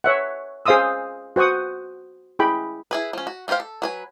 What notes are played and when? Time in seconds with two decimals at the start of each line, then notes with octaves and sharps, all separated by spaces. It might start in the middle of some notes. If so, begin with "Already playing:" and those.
0.04 C#5 E5 F#5
0.66 G#4 C5 F5 C6 D#6 E6
1.36 F#4 C5 F#5 C#6 D#6
2.39 E4 G#4 G5 B5
2.91 E4 G#4 B4
3.13 F3 C#4
3.27 F#4
3.48 B3 F4 G4 C5 F5
3.60 A4
3.82 F#3 B4 G#5